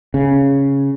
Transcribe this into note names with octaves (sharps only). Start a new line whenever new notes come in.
C#3